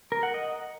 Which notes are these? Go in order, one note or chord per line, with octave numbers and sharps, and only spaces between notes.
A#4
F#5
D#5